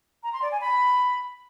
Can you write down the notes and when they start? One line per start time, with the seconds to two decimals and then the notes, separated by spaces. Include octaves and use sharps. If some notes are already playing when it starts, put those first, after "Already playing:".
0.23 A#5
0.33 C6
0.42 D5
0.51 G#5
0.61 B5